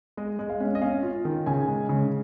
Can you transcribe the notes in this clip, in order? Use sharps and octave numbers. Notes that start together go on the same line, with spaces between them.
G#3 D#5
G#3
F5
C#4
D#5
C#4 F5
F4
D#3
C#3 G#5
G#3
C#3